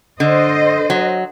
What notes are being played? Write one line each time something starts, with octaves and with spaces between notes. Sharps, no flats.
D3 C5 D#5
F#3